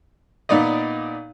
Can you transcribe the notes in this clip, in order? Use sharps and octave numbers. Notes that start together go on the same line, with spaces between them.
A#2 B3 D#4 D5 D#5